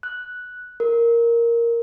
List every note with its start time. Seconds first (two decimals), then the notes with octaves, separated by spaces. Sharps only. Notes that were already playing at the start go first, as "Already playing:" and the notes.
0.03 F#6
0.80 A#4